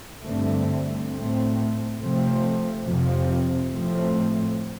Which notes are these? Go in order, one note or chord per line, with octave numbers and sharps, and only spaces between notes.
G2 D3 A3 C4
A2 A3 C4
C3 F3 A3 C4
F2 C3 F3 C4
A2 F3 A3 C4